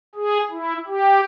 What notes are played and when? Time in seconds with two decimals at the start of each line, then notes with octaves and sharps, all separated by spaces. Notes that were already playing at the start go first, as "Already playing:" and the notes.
0.15 G#4
0.51 E4
0.87 G4